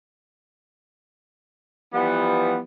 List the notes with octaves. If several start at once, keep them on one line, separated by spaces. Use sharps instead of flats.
E3 F3 G3 B3